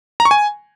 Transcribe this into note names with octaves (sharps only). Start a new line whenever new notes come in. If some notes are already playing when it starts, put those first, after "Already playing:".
A#5
C#6
G#5